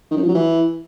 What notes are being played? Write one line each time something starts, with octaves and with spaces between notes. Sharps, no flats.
D#3
F#2
F3
F#3
E3